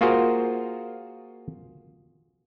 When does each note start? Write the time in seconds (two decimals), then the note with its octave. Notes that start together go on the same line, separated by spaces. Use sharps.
0.01 A#3 F4 F#4 G#4 A#4 C5